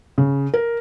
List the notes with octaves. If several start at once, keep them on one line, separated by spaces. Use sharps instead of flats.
C#3
A#4